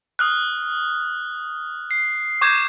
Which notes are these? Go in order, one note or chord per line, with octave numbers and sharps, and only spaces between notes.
D#6 F6 F#6
C7
C#6 D6 G6 G#6 E7